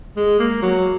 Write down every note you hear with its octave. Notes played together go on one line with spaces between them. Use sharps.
G#3
A#3
F#3